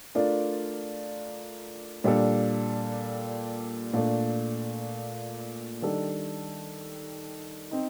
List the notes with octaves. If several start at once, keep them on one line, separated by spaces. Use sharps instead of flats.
A3 D4 F4 A#4 D5
A#2 G3 D4 A4
A#2 A3 D4
D#3 G3 D4 A4
C4 D#4